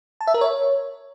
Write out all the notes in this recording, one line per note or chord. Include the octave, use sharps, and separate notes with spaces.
A5
E5
A#4
C#5